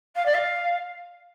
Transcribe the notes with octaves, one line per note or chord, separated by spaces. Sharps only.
F5
D5
F5